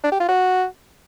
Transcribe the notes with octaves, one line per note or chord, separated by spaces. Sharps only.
D4
G4
F4
F#4